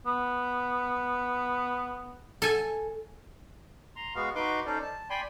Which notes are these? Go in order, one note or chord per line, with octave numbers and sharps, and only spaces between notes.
B3
A4 G#5
A#5 C6
G#3 B3 F#4 F5
D#4 F#4 B4 C6 D6
C#4 D#4 A4 C5 D5
A5
D5 G5 G#5 B5 C6